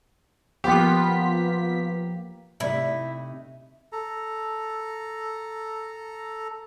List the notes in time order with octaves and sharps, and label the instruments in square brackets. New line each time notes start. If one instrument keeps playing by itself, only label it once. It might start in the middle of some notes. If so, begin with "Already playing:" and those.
[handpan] F3 A#3 [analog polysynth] B3 F4 B6 [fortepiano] G4
[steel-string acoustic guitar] C3 A3 D#4 [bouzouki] E4
[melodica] A4 A#5